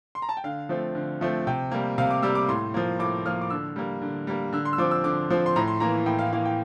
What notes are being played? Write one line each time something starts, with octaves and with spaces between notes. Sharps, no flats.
C6
A#5
A5
G5
D3 F5
F3 A3 C4
D3
F3 A3 C4
C3 G5
G3 A#3
C3 F5
D6
G3 A#3 E6
D6
A2 C6
F3 A#3
A2 D6
F3 A#3 F6
D6
D3 E6
G3 A#3
D3
G3 A#3
D3 E6
C6
E6
F3 C4 D6
E6
D3 D6
F3 C4
C6
A2 A#5
C6
E3 A#3 A#5
A2 G5
F5
E3 A#3 F5
G5